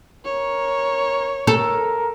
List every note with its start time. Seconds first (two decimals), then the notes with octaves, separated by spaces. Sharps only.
0.25 A#4 C#5
1.47 A4 A#4